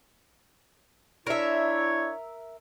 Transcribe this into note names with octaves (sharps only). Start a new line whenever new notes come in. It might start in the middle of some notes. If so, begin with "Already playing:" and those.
D4 E4 A#4 C#5 E5